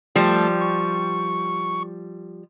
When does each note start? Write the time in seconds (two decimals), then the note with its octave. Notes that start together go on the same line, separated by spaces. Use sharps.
0.16 F3 G3 A3
0.61 C#6